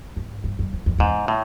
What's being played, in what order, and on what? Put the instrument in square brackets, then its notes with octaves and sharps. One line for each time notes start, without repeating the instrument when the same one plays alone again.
[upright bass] G#2
G2
F#2
F2
F2
[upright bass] E2 [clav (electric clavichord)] G#2
[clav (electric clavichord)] A2